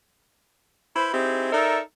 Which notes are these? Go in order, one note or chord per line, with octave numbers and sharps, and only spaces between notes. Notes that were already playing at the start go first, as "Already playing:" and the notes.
E4 B4 C5
C4 D#4 E4 G4 G#4
D#4 A4 A#4 D5 E5